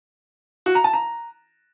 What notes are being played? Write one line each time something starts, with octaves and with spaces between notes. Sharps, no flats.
F#4
A#5
A5
A#5